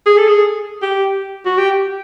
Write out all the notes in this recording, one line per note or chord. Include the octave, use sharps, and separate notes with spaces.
G#4
A4
G#4
G4
F#4
G4